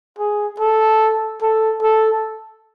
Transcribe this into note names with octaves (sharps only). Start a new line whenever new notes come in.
G#4
A4
A4
A4